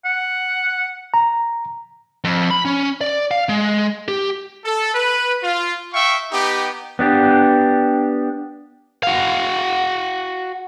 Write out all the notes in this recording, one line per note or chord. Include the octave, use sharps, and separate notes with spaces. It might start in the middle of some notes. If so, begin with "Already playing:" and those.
F#5
A#5
F2
B5
C#4
D5
F5
G#3
G4
A4
B4
F4
E5 F5 G5 C#6
B3 D#4 G4
B3 D4 G4
F#4 F5